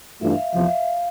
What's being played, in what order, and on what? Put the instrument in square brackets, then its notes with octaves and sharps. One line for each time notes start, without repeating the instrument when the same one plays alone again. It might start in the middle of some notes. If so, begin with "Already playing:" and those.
[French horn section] G2 E3 A3 D4 F4 [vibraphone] E5
[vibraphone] F5
E5
[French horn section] E2 C3 F3 [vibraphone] F5
[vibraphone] E5
F5